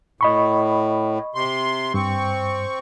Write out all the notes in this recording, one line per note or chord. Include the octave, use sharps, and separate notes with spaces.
A2 D#5 B5 C#6
C3 C6
G2 C4 C#6